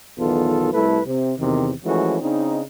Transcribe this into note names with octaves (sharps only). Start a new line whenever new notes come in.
B1 E2 B2 D#3 F4 A4
C2 G3 A3 E4 A4 B4
C3
E2 C3 D#3
E3 F3 G#3 A3 C#4 F#4
C#3 C4 D4 D#4